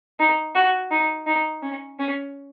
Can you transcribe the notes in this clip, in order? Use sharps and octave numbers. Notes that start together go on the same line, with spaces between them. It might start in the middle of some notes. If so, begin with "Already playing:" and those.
D#4
F#4
D#4
D#4
C#4
C#4